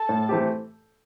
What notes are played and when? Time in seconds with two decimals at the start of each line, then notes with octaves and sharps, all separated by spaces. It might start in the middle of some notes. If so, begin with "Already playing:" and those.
Already playing: A4 A5
0.09 A2
0.29 E3 A3 C4 G4